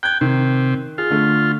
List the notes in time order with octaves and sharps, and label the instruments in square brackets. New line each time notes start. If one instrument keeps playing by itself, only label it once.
[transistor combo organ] G5 [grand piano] F#6 G#6
[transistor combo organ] C3 [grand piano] D#3
[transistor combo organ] F4 [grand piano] G#4
[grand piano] D3 A3